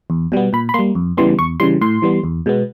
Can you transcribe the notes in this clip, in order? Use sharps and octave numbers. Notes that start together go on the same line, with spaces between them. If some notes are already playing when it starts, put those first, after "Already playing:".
E2
B2 G3 B3
A#2 B5
B5
G3 A#3 C6
F2
C#3 E3 G3 B3 C6
E2 C#6
C#3 E3 G3 C6
A2 C6
E3 G3 B3
E2
B2 G#3 B3